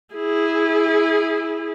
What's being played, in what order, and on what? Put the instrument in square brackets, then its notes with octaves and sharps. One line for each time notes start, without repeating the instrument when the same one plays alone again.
[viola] E4 G#4